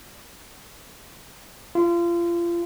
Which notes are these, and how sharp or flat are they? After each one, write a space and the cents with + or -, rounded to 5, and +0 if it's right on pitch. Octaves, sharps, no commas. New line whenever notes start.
F4 -30